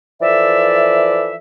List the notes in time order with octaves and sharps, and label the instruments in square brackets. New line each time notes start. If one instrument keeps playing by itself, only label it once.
[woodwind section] E3 F3 A4 D5 E5